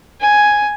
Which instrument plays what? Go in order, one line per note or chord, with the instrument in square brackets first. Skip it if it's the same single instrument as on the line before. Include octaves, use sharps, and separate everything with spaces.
[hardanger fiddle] G#5